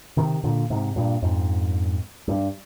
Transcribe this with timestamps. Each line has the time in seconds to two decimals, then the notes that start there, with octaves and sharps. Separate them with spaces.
0.17 C3 D#3
0.44 A#2 D3
0.70 G#2 C3
0.96 G2 A#2
1.22 F2 G#2
2.28 G2